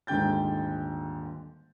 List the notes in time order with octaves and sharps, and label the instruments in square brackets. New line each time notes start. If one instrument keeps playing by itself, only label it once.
[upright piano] D#1 G#2 D3 G5 G6 A6